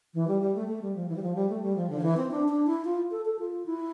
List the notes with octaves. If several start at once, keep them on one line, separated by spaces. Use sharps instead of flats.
E3
G3
G3
A3
A3
G3
F3
E3
G3
F3
G3
A3
G3
F3
D3
F3
E3
C4
D4
D4
E4
F4
A4
A4
F4
E4